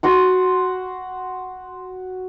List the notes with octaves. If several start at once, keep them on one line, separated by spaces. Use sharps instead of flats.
F#4 F#5 C6